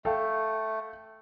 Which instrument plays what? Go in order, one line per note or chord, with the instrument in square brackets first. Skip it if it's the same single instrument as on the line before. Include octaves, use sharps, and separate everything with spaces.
[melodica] A3 [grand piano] A4 F5 G5